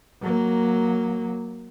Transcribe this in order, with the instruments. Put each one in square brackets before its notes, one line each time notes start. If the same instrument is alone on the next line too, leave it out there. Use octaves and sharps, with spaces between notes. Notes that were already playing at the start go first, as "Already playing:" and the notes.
[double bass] F#3 A#3